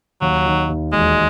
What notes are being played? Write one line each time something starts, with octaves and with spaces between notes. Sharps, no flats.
D#2 F#3
D#3
D#2
E1 G#3